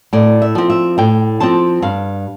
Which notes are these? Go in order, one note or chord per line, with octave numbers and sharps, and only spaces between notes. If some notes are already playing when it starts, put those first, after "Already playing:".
A2 D5
E5
F3 C4
E5
A2 G5
F3 C4 A5
G2 F5